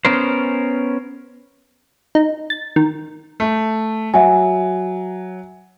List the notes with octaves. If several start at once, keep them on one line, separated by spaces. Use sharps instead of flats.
B3 C#4 A#4 C5
D#4
A6
D#3
A3
F#3 E5 F#5 G#5